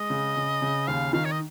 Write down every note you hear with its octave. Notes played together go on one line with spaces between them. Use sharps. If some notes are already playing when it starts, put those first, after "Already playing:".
Already playing: G#3 D#5
C#3
C#3
C#3
D#2 F5
D#3 F5
C#5
D#5